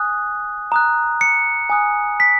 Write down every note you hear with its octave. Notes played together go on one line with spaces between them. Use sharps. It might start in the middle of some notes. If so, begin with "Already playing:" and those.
Already playing: G#5 D#6 F#6
A#5 D#6 F#6
C#7
G#5 D#6 F#6
B6